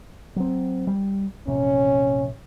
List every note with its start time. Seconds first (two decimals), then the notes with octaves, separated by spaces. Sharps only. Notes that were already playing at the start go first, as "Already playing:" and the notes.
0.36 F#3 C4
0.87 G3
1.47 A#1 F#2 C3 C#4